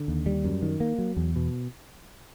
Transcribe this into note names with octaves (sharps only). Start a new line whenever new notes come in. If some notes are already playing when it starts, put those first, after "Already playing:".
Already playing: D3
D#2
G3
F#2
D#3
A#3
F#3
E2
B2